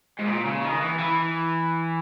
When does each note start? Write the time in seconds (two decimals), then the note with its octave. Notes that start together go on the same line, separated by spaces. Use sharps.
0.19 G#2
0.28 A#2
0.45 C#3
0.63 D#3
0.81 E3
0.99 E3